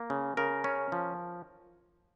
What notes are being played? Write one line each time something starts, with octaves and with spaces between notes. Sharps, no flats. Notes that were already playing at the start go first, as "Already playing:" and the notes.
Already playing: A#3
C#3
C#3 A#4
C#4
F3